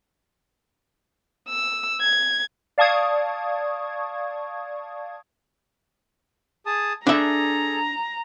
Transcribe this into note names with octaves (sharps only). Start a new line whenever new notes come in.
E6
G#6
D5 F5 A5 C#6 D#6 G#6
G#4 A5 D#6
D4 G#4 A4 E5 A#5